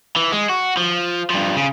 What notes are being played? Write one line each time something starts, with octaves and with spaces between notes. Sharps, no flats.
E3
G#3
F#4
F3
G2 F3
C#3